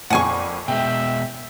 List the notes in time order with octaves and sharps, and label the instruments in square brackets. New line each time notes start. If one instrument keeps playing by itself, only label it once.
[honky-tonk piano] F2 A#2 [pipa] F#5 G#5 C#6
[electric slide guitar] B2 G#3 [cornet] E5 [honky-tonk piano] G5